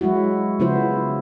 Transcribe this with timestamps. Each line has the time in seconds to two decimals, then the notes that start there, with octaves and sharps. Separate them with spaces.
0.01 F#3 G#3 E4 F#4
0.60 C#3 F3 B3 E4 C5